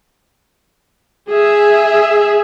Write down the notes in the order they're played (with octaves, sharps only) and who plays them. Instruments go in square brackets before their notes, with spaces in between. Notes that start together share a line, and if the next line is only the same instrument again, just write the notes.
[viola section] G#4 E5